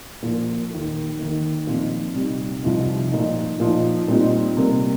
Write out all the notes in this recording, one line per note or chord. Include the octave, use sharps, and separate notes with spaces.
A#2 F3 A#3
D#2 D#3 A#3
D#2 D#3 A#3
A#2 F3 C4 D#4
C3 G3 D#4
C2 C3 F3 D#4
A#2 F3 D#4
A#2 F3 D#4
A#2 G3 C4 D#4
C3 G3 A#3